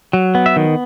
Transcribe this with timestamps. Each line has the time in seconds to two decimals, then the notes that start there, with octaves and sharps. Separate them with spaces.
0.13 F#3
0.35 B3
0.46 E5
0.56 D#3